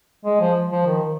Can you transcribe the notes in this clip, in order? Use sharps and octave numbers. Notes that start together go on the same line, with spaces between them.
G#3
F3
F3
D#3